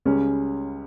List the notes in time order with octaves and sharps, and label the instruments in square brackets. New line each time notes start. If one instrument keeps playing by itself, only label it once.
[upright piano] C#2 C#3 G3 C#4